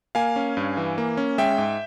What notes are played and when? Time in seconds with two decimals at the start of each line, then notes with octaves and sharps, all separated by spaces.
0.15 A#3 F5 G#5
0.36 C#4
0.57 G2
0.77 E3
0.98 A#3
1.17 C#4
1.38 G#3 E5 G5
1.58 G#2